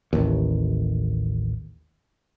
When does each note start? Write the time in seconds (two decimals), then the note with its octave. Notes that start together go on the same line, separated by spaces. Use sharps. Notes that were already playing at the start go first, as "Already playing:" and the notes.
0.13 A1 D#2